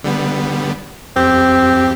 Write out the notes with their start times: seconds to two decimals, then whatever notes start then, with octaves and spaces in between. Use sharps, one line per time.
0.04 D3 G3 B3
1.16 F2 C4 G4